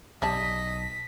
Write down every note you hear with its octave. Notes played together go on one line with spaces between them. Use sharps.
B1 G4 D5 D#5 A5 B6